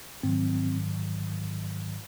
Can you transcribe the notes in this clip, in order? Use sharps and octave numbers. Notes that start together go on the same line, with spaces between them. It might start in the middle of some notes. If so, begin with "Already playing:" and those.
G#2 D#3 F#3 C4